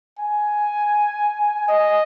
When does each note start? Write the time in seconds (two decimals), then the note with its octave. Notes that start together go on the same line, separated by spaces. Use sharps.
0.19 G#5
1.68 D#5